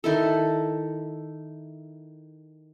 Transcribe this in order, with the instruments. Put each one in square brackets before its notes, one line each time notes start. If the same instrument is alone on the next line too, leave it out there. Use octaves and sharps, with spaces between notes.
[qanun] D#3 E4 A4